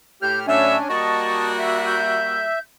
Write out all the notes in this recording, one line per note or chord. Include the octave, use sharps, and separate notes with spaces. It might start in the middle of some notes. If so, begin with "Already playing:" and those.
A2 G4 F6 G6
A2 F#3 C#4 D4 E5 G#5
G3 A#3 F#4 D#5 A5 C#6
E5
G6